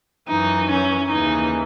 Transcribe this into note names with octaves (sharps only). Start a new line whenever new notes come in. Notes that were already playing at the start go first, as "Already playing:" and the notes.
F#2 E3 D#4
C#4
D#2 C#3 E3 D#4